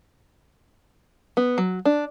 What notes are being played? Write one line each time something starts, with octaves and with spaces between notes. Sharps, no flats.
B3
F#3
D4